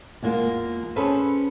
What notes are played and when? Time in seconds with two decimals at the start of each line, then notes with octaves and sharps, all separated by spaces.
0.22 E2 G#3 A#3 F4
0.96 C#4 G#4 A4 B4 C5